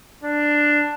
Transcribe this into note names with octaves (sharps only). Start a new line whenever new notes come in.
D4